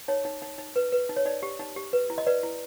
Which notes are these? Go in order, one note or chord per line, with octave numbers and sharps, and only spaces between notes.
D#4 C#5
D#4
D#4
D#4
B4
B4
D#4
C#5
D#4 D5
G4
D#4
G4
B4
E4
D#5
B4 D5
E4